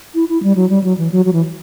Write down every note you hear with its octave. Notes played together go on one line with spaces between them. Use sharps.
E4
E4
G3
F#3
G3
F#3
E3
F#3
F#3
E3